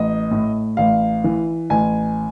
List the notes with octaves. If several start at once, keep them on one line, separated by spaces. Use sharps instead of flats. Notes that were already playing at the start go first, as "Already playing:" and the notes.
Already playing: A1 D#5
A2
A1 F5
E3
A1 G#5